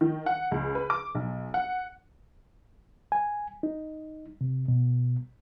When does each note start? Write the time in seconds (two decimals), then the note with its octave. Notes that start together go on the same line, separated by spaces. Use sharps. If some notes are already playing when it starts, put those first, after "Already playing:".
0.01 D#3
0.26 F#5
0.51 C#2
0.75 B4
0.90 D6
1.15 B1
1.54 F#5
3.12 G#5
3.63 D#4
4.41 C3
4.68 B2